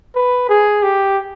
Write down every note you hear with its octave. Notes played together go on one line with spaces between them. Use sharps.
B4
G#4
G4